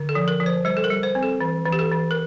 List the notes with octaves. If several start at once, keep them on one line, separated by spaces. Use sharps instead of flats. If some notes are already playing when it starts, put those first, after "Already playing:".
Already playing: D3
A4
F3
A#4
F3
C5
G3 C5
A4
A#4
G3
C5
C4
A4
E3
E3
G4
A4
E3
A#4